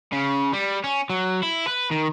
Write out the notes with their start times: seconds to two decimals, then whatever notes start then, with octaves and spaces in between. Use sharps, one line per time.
0.12 C#3
0.53 G3
0.84 C#4
1.10 F#3
1.42 E4
1.67 B4
1.91 D#3